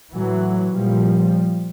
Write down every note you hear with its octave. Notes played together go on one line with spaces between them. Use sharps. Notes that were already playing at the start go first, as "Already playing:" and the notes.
A2 E3 F#3
A#2 F3 G3